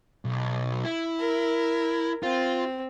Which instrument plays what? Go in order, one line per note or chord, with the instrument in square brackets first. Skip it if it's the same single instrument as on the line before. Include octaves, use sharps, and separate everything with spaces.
[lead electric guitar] B1
E4
[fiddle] A#4
[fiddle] C4 [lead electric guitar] F4